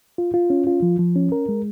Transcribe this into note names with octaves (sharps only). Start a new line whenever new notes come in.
F4
F4
C#4
F4
F3
F3
C#4
A#4
G#3